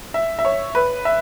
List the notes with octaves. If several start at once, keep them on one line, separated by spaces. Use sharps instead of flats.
E5
E5
C#5
B4
E5